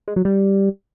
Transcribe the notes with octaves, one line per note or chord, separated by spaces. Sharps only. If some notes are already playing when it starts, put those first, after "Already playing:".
G#3
F#3
G3